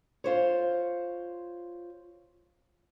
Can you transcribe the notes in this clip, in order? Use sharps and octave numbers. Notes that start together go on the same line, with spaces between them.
F4 C5 C#5